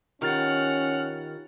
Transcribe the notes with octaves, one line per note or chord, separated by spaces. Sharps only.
D#3 C#4 F4 G4 F#5 F6 A6